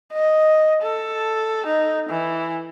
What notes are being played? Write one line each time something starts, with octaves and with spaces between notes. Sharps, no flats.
D#5
A4
D#4
E3